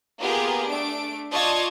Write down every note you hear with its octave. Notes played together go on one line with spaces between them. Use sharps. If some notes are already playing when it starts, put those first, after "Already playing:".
A#3 B3 F4 G4 G#4 A#4
A3 D4 D7
F4 D5 D#5 A5 C#6 G#6